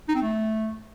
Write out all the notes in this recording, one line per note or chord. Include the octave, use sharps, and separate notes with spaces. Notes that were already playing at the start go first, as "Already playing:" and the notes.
D#4
C4
A3